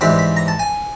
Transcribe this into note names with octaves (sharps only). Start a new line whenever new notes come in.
G#2 E3 G3 C4 B5
B5
A#5
A5
G#5